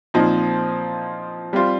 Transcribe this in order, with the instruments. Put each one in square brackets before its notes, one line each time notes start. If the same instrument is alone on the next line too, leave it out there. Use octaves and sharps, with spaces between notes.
[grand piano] A#2 F3 C4 D#4
G3 C4 F4